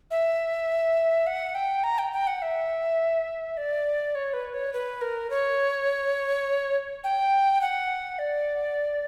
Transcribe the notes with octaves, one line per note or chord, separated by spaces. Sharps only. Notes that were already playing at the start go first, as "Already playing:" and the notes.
E5
F#5
G5
A#5
G5
G5
F#5
E5
D5
C#5
B4
C#5
B4
A#4
C#5
G5
F#5
D5